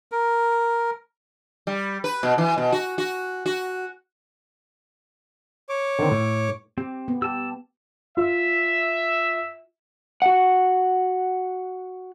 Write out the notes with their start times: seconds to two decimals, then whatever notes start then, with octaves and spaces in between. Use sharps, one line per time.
0.12 A#4
1.67 G3
2.04 B4
2.23 B2
2.38 E3
2.58 B2
2.72 F#4
2.98 F#4
3.46 F#4
5.69 C#5 D6
5.99 D3 D#3 C4
6.11 A2
6.78 C4 G4
7.08 B3
7.22 G4 A5 E6
8.17 F4 E5
10.22 F#4 F#5